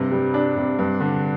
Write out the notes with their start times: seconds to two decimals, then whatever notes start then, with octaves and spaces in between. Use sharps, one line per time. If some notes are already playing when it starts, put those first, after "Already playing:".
Already playing: G2 C3
0.12 G3
0.34 D4
0.57 C3
0.78 G2
1.00 D3